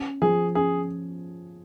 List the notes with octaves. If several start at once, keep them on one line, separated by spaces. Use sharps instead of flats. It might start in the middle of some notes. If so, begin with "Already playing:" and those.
Already playing: C#4
F3 G#4
C#4 G#4